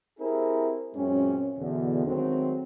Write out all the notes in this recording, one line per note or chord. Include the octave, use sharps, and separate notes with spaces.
C4 E4 G4 G#4 A#4 C5
F#2 A#2 G#3 C4 C#4
E2 B2 D3
D#3 F#3 G#3 A3 C4